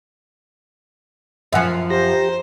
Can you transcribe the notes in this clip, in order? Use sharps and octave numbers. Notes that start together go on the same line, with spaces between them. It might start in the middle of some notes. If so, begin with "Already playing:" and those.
F#2 F3 E5 F#5 G#5
G4 C5 A#5